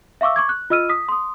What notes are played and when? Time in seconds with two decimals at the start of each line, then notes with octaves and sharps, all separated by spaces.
0.21 E5 F5 C#6 D6 E6
0.36 C#6 D6 G#6
0.49 F#6
0.70 F4 D#5 E6 F6 D#7
0.89 D#6 B6
1.08 C6 D#6